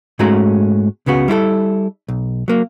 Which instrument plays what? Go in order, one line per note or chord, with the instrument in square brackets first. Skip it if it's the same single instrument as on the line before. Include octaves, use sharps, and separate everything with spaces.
[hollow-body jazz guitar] G#2 G#3 A3 C#4 F#4 A#5
C#2 C#3 B3 F#4
G3 E4 F4 A4
B1
F#3 A#3